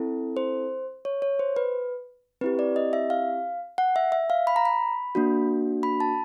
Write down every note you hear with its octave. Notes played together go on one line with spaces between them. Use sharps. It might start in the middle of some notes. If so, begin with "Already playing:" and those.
Already playing: C4 E4 A4
C5
C#5
C#5
C5
B4
C4 E4 G4 B4
D5
D#5
E5
F5
F#5
E5
E5
F5
B5
A#5
B5
A#3 D4 F#4
B5
A5